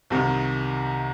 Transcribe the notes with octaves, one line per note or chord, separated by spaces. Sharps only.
C2 C3 D#3